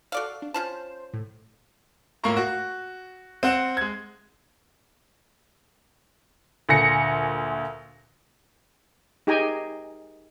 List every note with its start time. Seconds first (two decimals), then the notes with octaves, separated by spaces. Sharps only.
0.12 F#4 A4 D5 F5
0.42 D4
0.54 C#4 F4 C5 A5
1.14 A2
2.24 A2 A#3 F4 A#4 A#5 C#6
2.36 F#4
3.43 C4 F#5 E7
3.77 G#3 G#6
6.69 D2 A#2 G#5 A#6 C#7
9.27 D#4 G4 G#4 G5 G#5 A#5